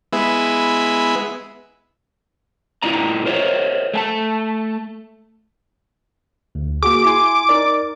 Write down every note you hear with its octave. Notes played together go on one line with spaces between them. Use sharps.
G#3 B3 E4
A2 E4 F4 D5 D#5 A#5
A#4 C5 C#5 D#5 E5
A3 G#5 A5
D2
A#3 F#4 G#4 D6
E4 G#5 C6
D#4 A#4 D5